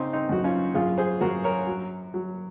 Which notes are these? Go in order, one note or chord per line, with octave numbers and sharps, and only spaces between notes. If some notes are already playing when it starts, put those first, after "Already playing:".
Already playing: C#3 C4 D#4
C4 D#4
F#2 F#4
C#4 F4
F#2 F4 G#4
G#4 C5
F#2 F#4 A#4
A#4 C#5
F#3
F#3